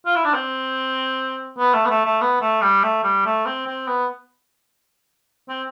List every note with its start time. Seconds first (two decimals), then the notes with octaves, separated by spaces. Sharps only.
0.06 F4
0.16 E4
0.25 D4
0.34 C4
1.58 B3
1.74 A3
1.85 B3
1.90 A3
2.05 A3
2.21 B3
2.41 A3
2.62 G3
2.83 A3
3.04 G3
3.25 A3
3.46 C4
3.67 C4
3.88 B3
5.49 C4